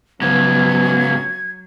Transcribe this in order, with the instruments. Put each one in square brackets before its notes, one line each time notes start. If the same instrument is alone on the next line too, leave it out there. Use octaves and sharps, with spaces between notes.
[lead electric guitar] G#2 C#3 [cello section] F#3 [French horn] B3 [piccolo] G#6